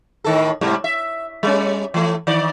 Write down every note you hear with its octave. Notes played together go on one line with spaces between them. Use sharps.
A2 D#3 A4
G#2 C3 G3
E5
G3 C#4
E3 A3
D#3 D5